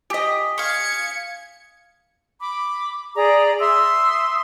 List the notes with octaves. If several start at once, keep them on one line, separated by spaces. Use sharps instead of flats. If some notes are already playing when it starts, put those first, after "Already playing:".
G4 D#5 G#5 D#6 B6
F5 C#6 G#6 C#7
B5 D6
G#4 D5 A#5
E5 C6 D#6 E6